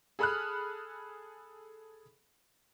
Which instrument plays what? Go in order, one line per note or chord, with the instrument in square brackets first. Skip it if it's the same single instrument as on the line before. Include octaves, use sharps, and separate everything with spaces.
[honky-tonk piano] G#4 A4 B5 D#6 F6 F#6